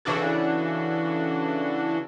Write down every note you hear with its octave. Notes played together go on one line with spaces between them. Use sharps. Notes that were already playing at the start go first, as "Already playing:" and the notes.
C#3 E3 D4 F#4 A4